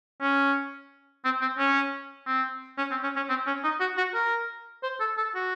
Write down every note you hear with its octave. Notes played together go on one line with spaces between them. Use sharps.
C#4
C4
C4
C#4
C4
C#4
C4
C#4
C#4
C4
C#4
D#4
F#4
F#4
A#4
C5
A4
A4
F#4